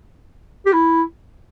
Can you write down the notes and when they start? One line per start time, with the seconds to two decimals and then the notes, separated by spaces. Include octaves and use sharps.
0.66 G4
0.73 E4